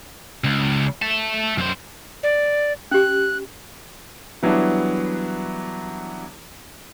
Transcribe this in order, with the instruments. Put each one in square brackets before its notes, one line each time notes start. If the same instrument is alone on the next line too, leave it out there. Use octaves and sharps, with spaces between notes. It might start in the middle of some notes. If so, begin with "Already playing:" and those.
[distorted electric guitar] C#2
E5 A5
F#2 C5
[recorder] D5
[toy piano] C#4 G4 [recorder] F#6
[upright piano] E3 F#3 G3 B3 D4 E4